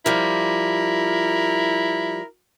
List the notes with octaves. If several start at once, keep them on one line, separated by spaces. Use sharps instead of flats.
F3 G3 E4 A#4